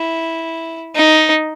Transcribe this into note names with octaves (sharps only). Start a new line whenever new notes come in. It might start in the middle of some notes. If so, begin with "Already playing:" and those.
Already playing: E4
D#4